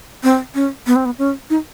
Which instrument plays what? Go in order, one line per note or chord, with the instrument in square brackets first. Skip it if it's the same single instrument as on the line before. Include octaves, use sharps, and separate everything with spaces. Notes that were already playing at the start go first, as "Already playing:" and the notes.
[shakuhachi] C4
C#4
B3
C4
B3
C#4
D#4